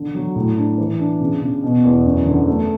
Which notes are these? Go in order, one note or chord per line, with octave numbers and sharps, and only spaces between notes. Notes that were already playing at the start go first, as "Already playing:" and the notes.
Already playing: D3
F#3
A2
D4
E3
D4
C#3
C#3
B2
E2
F#2
D3
A3